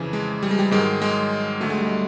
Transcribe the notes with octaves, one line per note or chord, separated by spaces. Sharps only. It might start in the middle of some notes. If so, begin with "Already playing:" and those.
Already playing: F2 C#3 E3
G#3
G3
G#3
G3
G#2 D#3 F#3 G#3
G#3
D2 D3 F#3 A3
G#3
G3
G#3